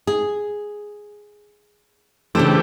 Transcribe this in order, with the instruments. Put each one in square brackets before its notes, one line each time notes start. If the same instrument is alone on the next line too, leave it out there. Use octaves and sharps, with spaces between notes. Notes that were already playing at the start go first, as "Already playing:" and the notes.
[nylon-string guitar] G#4
[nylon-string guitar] C#3 D4 C5 [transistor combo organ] E3 A3 G4